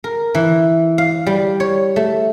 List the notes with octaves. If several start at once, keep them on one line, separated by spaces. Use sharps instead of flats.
A#4
E3
F5
G3
C#5
A3